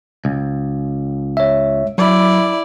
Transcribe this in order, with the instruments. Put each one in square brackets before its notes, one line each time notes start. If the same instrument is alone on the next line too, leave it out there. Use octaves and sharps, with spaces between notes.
[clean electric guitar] C#2
[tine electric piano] C#5 E5
[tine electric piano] F#3 [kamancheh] E4 D5